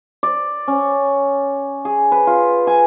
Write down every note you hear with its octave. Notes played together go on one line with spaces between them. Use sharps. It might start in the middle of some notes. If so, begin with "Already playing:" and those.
D5
C#4
G#4
B4
F4
G#5